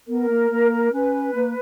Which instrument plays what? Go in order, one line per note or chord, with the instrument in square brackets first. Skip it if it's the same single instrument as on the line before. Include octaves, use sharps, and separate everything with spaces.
[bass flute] B3 [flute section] A#4
[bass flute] A#3
A#3
[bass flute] C#4 [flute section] B4
[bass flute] A#3